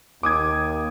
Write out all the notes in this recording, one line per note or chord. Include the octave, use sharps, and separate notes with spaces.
D#2 D6 D#6 G#6